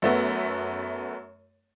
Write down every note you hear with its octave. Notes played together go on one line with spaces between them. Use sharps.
F#2 A3 B3